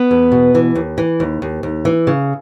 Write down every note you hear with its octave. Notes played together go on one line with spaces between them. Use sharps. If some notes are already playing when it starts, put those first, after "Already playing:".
Already playing: B3 B4
E2
B2
E3
D#2
E3
D#2
D#2
D#2
E3
C#3